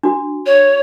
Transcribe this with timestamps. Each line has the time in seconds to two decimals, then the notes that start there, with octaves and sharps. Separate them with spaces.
0.03 D4 F#4
0.46 C#5